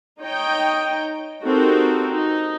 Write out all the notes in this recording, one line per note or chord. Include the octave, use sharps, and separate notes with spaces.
D#4 C#5 D#5 G5
C4 D#4 F#4 G4 A4 A#4
D#4